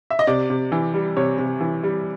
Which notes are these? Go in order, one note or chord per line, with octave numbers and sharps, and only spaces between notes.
E5
D#5
C3 D5
C3
E3
G3
C3 C#5
C3
E3
G3